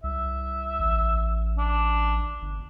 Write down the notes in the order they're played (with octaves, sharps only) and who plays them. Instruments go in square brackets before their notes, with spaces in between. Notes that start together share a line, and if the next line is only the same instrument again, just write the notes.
[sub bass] C2 [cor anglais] E5
[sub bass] A1
[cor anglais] D4
[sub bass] G1